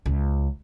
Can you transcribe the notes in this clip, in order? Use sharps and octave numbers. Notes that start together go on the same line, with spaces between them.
C#2